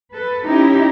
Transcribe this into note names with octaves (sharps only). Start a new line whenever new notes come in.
A4 B4
C#4 D#4 E4 G4